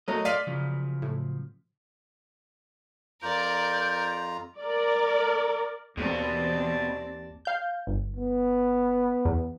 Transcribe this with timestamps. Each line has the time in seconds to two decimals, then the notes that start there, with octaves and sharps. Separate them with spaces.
0.08 F#3 A3 A4 A#4 D#5
0.25 D5 F5 C6 F6 B6 D#7
0.47 C#3 F3 F#3
1.02 A2
3.23 F2 F4 A#4 D5 A#5 G6
4.59 A#4 D5
5.97 D#2 B2 E3 C4 D5 A5
7.45 F5 G6
7.87 G1
8.16 B3
9.25 E2